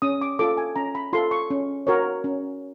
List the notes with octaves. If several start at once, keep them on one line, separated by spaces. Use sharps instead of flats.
C#4 D#6
D6
F4 A4 D6
G#5
C#4 A#5
B5
F4 A4 C6
C#6
C#4
F#4 A#4 C#5
C#4